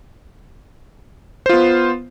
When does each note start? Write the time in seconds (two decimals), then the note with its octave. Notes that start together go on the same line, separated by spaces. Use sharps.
1.46 C5
1.49 F4
1.53 B3